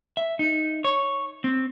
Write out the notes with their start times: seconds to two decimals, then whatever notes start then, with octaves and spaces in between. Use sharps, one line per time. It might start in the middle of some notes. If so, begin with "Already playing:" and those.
0.17 E5
0.39 D#4
0.84 C#5
1.44 C4